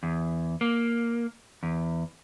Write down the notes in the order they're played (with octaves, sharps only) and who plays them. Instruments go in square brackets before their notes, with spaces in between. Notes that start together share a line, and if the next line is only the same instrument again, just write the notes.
[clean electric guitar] E2
A#3
E2